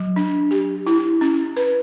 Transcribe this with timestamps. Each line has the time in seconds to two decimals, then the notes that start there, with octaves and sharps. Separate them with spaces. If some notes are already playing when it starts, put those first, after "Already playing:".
Already playing: F#3
0.16 D4
0.51 G4
0.87 E4
1.21 C#4
1.57 B4